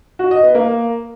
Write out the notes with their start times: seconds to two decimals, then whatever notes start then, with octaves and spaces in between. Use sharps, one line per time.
0.19 F#4
0.31 D#5
0.43 B3
0.55 A#3